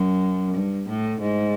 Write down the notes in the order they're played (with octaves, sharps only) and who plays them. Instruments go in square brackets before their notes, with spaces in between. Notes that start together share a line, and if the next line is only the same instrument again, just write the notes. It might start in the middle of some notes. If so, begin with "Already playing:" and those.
Already playing: [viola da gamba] F#2
G2
A2
G#2